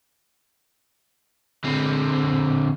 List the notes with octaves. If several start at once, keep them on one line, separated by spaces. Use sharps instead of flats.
D3 C4